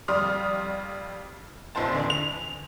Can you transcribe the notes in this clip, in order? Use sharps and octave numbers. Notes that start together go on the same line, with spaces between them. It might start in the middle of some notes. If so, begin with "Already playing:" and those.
F2 G3 D5 C6 D#6 F6
F1 A#1 C4 C5 A5
E2 D3
F7